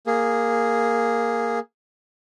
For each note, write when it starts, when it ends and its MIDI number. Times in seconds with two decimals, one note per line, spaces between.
0.07 1.59 58
0.07 1.59 68